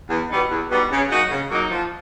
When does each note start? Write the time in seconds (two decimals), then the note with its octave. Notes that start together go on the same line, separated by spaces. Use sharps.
0.09 E2
0.30 B2 G3 B3 D#4
0.50 E2
0.69 B2 G3 B3 D#4
0.90 C#3
1.10 F#3 A#3 D#4 F#4
1.30 C#3
1.50 F#3 A#3 D#4 F#4
1.71 F3